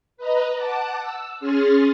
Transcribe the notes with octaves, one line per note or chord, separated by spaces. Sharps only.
B4 D#5 A#5
F#5 A5 D6 F#6
E6
C#4 G#4 C6 F6 A6